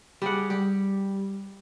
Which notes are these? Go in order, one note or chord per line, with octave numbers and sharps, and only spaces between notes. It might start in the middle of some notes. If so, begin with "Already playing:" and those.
G3 G#4 F#5 D6
G3 G4